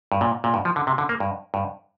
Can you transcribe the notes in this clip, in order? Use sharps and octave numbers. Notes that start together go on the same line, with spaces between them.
G2
A#2
A#2
G2
F3
D3
C3
D3
A#3
G2
G2